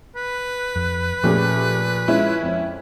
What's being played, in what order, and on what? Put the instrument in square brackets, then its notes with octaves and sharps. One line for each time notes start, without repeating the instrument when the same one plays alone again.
[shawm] B4
[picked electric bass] F2
[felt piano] A#2 C#4 G#4 [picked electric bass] F3 [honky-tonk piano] A3 G4
[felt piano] G#3 F4 [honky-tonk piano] C#4 E4
[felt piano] F2